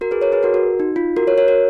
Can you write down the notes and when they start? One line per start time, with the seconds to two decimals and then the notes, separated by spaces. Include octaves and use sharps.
0.01 F#4 A#4
0.11 G#4 B4
0.21 A#4 C#5
0.32 G#4 B4
0.43 F#4 A#4
0.54 F#4
0.80 D#4
0.96 F4
1.17 F#4 A#4
1.27 A#4 C#5
1.38 A#4 C#5
1.48 F#4 A#4